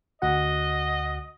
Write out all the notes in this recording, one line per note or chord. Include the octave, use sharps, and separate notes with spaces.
D2 F#4 D#5 F#5